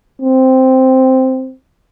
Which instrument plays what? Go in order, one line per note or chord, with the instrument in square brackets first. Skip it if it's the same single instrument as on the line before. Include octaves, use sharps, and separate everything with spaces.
[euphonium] C4